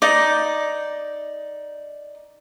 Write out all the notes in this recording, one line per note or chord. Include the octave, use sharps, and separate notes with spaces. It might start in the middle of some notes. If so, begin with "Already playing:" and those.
D#4 D5